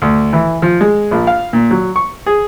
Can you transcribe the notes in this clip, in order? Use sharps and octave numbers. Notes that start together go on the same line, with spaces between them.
D2
E3
F3
G#3
A#1
F5
A#2
F#3
C#6
G#4